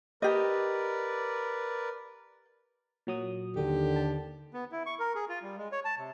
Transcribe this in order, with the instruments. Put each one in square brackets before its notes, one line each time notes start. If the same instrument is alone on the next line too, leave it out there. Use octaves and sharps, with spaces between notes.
[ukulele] G4 D#5 [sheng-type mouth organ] A#4 B4 D5
[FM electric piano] A#2 F#3 D#6
[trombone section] D#2 D3 [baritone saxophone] G4
[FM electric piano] A5
[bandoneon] B3
E4
C#6
A#4
G#4
F4
G3
G#3
C#5
A5
C3